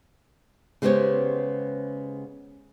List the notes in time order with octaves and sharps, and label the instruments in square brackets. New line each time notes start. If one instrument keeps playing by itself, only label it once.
[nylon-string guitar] C#3 G#3 B3 G4 C5 C#5